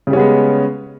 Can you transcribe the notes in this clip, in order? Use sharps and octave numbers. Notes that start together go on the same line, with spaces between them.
C#3 G3 G#3 B3 C#4